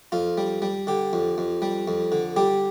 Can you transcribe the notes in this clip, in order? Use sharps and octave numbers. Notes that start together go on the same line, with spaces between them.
F2 F4
G3
G3
D3 G4
F2
F2
G3
F2
D3
G3 G4